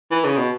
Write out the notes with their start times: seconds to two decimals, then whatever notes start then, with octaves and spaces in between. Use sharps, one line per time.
0.12 E3
0.25 C#3
0.37 B2